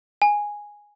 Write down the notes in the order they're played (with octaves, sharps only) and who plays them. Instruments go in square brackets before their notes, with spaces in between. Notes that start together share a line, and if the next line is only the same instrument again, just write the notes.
[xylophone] G#5